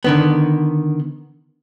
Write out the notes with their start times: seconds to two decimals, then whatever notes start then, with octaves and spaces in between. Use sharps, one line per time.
0.04 D3 D#3 B3